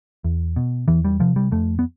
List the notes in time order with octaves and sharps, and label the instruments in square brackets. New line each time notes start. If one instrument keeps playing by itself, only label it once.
[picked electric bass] E2
B2
E2 E3
G3
C3 F3
G3
F2 A3
B3